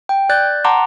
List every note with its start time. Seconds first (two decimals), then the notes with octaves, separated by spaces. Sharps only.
0.09 G5
0.29 D5 F#6 G6 A6
0.64 F#5 A5 A#5 C6 D6